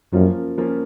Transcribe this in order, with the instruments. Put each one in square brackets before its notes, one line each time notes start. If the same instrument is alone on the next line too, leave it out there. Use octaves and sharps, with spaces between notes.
[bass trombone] F#2 [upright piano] F3 A#3 C#4 F4
[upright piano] F3 A#3 C#4 F4